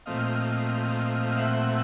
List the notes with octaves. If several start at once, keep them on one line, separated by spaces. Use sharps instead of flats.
A#2 F3 A3 C4 D#5 F5
E5 F#5